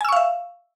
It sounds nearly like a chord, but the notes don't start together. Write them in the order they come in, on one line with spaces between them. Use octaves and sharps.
G#5 E6 C#6 F5 E5